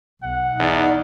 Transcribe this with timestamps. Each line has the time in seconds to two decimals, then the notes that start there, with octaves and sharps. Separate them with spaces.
0.23 B1 F#5
0.59 E2 D#4 D5